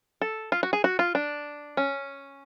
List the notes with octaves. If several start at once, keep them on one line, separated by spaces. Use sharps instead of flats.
A4
F4
F#4
G#4
F#4
F4
D4
C#4